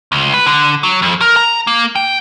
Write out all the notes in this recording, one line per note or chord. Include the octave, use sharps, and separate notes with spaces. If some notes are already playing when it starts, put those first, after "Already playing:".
C#2
B4
D3
F#3
F2
A#4
A#5
A#3
G5